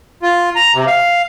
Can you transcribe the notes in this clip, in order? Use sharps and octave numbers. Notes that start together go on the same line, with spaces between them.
F4
A#5
C3
F5